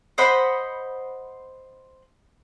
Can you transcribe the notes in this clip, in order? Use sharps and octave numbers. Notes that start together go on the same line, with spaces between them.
C5 D#5 F#5 B5